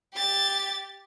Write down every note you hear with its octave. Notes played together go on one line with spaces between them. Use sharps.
G4 A6